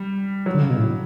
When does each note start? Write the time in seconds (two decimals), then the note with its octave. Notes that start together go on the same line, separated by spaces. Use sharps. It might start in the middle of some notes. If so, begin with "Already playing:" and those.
Already playing: G3
0.46 F#3
0.55 D3
0.62 C#3
0.70 B2
0.78 A2